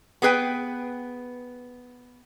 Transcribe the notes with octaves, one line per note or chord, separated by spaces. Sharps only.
B3 G#4 B4 G5